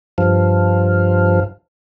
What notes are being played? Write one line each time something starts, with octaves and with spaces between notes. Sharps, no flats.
G2 F3